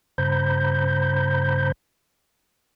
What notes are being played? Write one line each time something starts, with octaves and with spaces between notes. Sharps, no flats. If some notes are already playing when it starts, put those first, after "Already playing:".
G2 C#3 C5 A#5 B5 G6